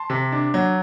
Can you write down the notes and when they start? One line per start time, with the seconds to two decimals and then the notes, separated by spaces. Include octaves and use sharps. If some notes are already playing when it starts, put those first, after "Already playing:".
Already playing: A5 C6
0.10 C3
0.32 D4
0.54 F#3